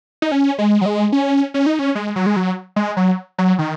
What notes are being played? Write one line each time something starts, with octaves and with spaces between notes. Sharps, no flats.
D#4
C#4
G#3
F#3
G#3
C#4
C#4
D#4
C#4
G#3
F#3
G#3
F#3
G#3
F#3
F#3
D#3